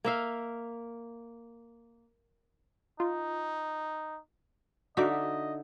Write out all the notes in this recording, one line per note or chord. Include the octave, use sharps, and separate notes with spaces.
A#3 E5 F5
D#4 F4
D3 D#4 F#4 D#5 E5 D6 B6